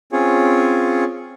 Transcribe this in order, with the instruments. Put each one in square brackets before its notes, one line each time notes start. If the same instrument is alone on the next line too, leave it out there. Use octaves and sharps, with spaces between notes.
[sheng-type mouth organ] C4 C#4 F4 G#4 C#5